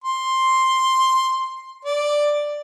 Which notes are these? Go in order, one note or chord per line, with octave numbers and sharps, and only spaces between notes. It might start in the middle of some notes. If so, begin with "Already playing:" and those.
C6
D5